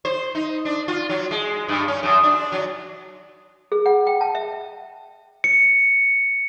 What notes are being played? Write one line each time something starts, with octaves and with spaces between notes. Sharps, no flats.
C5
D#4
D4
F4
F#3
G#3
G2
C#4
F#2
D4
F#3
G#4
F#5
G5
A5
E5
C#7